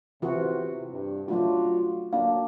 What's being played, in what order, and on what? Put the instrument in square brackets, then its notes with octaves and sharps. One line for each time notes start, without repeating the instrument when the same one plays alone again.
[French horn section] C3 [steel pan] E3 F4 F#4
[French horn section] G2
[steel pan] F#3 A3 D4 [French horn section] F4 F#4
[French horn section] F#3 [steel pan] A#3 D4 [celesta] F5